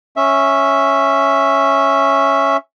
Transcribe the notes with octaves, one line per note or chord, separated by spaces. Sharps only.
C#4 E5